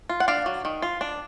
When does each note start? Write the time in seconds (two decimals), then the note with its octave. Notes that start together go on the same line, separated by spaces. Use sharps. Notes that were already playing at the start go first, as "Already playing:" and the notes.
0.09 F4
0.20 F#5
0.28 D4 D5 F5
0.46 F#3
0.65 D#3
0.82 F4
1.01 D4